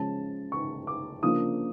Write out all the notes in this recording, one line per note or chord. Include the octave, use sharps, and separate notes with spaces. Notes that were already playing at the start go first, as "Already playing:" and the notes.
Already playing: C#3 F3 G#3 C#4 F4 A5
C#6
D6
C#3 F3 A#3 D4 F4 D#6